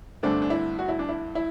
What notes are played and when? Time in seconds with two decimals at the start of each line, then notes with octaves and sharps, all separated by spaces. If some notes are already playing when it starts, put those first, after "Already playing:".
0.23 G2 D3 A3 C4 D4
0.42 D4
0.50 E4
0.79 F#4
0.89 E4
0.99 D4
1.09 E4
1.35 E4